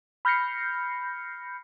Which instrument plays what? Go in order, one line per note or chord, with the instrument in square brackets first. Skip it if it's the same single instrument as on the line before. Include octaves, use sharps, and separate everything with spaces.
[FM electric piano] B5 F6 G6 A#6 C7 C#7